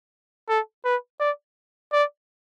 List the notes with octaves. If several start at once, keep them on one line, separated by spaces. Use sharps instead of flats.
A4
B4
D5
D5